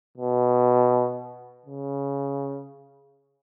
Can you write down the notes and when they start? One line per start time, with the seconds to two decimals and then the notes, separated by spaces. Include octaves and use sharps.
0.17 B2
1.66 C#3